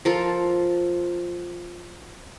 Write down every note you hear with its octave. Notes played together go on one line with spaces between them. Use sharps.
F3 F4 A4 A#4